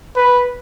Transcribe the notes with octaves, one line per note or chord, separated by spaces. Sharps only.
B4